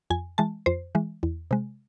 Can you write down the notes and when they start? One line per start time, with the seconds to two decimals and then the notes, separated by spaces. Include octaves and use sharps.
0.10 F2 G#5
0.38 E3 G#3 A5
0.66 F2 C5
0.95 E3 G#3
1.23 E2
1.51 C3 G#3